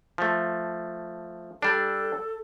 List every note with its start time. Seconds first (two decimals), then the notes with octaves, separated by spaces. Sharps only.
0.18 F3 A3
1.62 G3 D4 A4